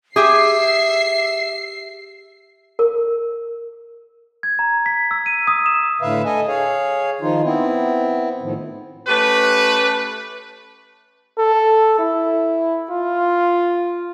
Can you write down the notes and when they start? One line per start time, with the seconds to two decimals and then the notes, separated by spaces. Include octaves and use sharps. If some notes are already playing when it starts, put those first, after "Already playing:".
0.16 G4 G#4 E5 C7
2.79 A#4
4.43 G#6
4.59 A#5
4.86 B6
5.11 E6
5.26 D#7
5.47 D#6
5.66 E7
6.02 A2 D3 B4 E5 F5
6.25 A4 D#5 G#5
6.48 G#4 C#5 F5
7.21 D#3 F3 D#4 F4
7.44 B3 C4 E4
8.41 A2 D#3 F3
9.07 A3 C#4 G4 B4
11.38 A4
11.99 E4
12.91 F4